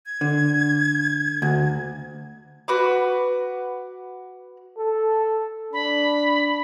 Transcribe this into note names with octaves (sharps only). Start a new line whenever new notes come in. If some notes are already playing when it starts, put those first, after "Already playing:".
G#6
D3
D2
F#4 B4 D6
A4
D4 B5